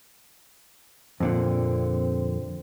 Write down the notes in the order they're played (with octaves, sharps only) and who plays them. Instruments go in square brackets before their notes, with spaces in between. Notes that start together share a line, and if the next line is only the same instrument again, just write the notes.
[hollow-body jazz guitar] F2 A#2 D3 [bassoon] C4